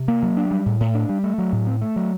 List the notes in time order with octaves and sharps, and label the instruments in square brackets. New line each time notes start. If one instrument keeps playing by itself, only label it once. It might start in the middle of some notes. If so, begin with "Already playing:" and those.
Already playing: [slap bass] C3
A#3
F#3
D4
G3
A2
A2
D4
G3
A3
F#3
A2
C4
A3
F#3